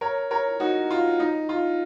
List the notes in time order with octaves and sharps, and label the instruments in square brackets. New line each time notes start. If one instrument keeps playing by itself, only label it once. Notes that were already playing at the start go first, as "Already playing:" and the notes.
[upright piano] A#4 C#5
A#4 C#5
D#4 F#4
F4
D#4
F4